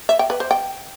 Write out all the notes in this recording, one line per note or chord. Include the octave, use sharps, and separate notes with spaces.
E5
G5
B4
C5
G5